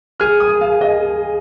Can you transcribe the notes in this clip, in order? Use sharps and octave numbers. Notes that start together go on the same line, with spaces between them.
G#4 F6
D#6
F5
D#5